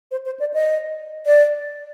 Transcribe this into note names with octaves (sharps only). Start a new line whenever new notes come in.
C5
C5
D5
D#5
D5